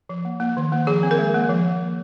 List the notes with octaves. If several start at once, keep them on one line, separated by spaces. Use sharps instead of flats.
F3
A#3
A#3
D#3
A#3
F3 G#4
C4
A#4
G#3
A#3
F3